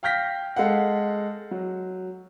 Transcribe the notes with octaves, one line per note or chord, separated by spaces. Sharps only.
F5 G5 F6 G6 A#6 B6
G#3 A4 F5 F#5
F#3